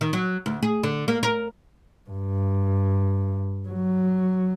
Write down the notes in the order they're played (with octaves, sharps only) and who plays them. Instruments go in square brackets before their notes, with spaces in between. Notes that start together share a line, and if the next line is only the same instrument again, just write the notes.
[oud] D#3
F#3
D2
G#4
D3
A#3
A#4
[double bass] G2
F#3